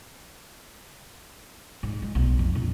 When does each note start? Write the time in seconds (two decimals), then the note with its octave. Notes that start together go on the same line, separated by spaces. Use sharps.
1.83 G#2
2.02 G#3
2.15 B1
2.39 F2
2.55 A#1